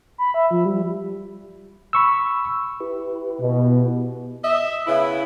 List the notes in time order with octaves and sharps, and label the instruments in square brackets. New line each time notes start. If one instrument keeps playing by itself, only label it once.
[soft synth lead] B5
E5
F3
G3
[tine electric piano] B5 C#6 E6
[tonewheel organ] E4 G4 B4
[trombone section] B2
[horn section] D#5 E5
C#3 B3 E4